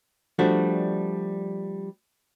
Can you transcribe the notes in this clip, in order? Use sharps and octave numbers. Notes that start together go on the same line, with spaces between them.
F3 G3 A3 D4 F#4